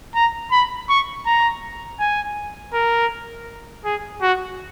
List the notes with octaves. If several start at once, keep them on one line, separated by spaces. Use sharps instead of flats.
A#5
B5
C#6
A#5
G#5
A#4
G#4
F#4